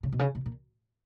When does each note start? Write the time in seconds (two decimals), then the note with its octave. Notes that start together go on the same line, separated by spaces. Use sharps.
0.03 C#3
0.13 B2
0.19 C#3
0.35 B2
0.46 A#2